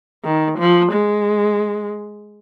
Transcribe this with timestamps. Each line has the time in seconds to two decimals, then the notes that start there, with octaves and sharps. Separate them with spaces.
0.24 D#3
0.58 F3
0.91 G#3